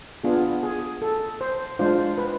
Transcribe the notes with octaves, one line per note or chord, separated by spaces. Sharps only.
B3 D4 F4 G#4
G#4
A4
C5
G#3 D4 F4 C5
B4